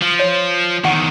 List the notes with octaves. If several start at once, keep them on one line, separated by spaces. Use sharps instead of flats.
F3
C#5
E2 D#3 F#5 C#6